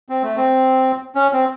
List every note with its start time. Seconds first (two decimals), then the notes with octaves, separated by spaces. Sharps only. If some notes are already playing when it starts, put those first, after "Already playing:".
0.09 C4
0.22 A3
0.37 C4
1.15 C#4
1.33 C4